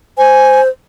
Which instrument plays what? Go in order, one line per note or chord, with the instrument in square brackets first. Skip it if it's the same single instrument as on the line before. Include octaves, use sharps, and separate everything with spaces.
[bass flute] C5 [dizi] G#5